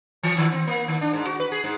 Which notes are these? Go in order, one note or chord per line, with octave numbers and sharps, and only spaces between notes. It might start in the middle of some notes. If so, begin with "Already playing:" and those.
E3
D#3
C4
A#3
D#3
D4
G#2
F#4
B4
G#4
G#2